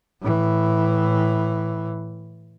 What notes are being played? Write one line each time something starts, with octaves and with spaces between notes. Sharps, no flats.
A2 E3